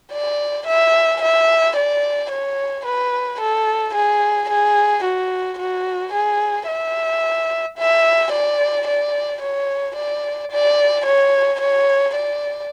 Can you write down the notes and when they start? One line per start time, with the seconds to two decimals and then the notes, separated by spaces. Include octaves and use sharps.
0.12 D5
0.67 E5
1.21 E5
1.76 D5
2.31 C#5
2.86 B4
3.40 A4
3.95 G#4
4.50 G#4
5.04 F#4
5.58 F#4
6.13 G#4
6.68 E5
7.78 E5
8.32 D5
8.87 D5
9.41 C#5
9.96 D5
10.51 D5
11.05 C#5
11.60 C#5
12.14 D5